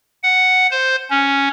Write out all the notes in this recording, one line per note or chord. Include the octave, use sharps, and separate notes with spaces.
F#5
C5
C#4